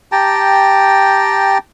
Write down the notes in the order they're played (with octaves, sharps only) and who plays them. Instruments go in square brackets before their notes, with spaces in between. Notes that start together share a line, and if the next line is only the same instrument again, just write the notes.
[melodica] G4 G5 A5 A#5